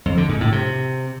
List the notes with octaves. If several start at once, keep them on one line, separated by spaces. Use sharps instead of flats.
F2
D3
G#2
A2
C3